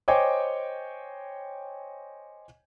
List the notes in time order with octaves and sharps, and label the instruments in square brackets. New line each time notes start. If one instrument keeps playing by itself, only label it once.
[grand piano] C5 C#5 D#5 G5 G#5 D6